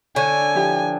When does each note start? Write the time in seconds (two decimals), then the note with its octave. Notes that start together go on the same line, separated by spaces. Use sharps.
0.16 D3 C#5 G#5
0.55 F3 E4 G4